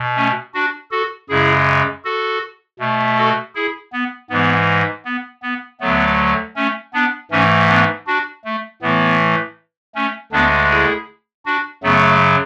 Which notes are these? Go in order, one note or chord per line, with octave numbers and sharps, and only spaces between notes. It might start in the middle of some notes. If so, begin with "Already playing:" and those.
Already playing: B2
A3 C#4
D4 F#4
F#4 A4
F#2 C#3 G#3 E4 G#4
F#4 A4
B2 A3
F#4 A4
E4 G#4
B3
G#2 E3 G#3 B3
B3
B3
D2 D3 F#3 A3 B3
A3 C#4
B3 D4
G#2 E3 A3 C#4
B3 D4
D4 F#4
A3
A2 E3 A3 B3
A3 C#4
D2 D3 G#3 B3 D4
E4 G#4
D4 F#4
F#2 C#3 F#3 A3 B3